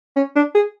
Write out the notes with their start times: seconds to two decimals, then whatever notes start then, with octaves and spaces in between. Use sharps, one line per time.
0.16 C#4
0.36 D4
0.55 G#4